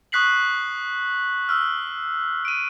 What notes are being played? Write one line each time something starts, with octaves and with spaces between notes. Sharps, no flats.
C#6 D#6 F#6 B6 C7 F#7
E6 F6
D7 D#7